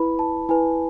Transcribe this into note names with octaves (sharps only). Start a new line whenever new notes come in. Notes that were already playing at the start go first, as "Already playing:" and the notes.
Already playing: E4 B4 B5
A5
E4 B4 G#5